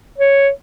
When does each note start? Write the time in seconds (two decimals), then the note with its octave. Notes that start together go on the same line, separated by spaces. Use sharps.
0.18 C#5